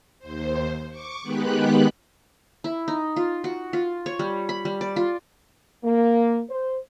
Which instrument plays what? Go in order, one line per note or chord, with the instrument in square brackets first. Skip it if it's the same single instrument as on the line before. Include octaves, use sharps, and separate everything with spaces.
[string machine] D#2 C5
C#6 D6
D#3 G#3 B3 G4 B5 F#6
[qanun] E4
D#4
F4
F#4
F4
C#5
G3
B5
G3
D5
F4
[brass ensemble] A#3
C5